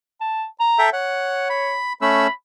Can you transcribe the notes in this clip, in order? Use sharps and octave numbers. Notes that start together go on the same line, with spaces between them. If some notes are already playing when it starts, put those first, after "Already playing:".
A5
A#5
A4 E5 G5
C#5 F#5
B5
A3 C#4 B5 E6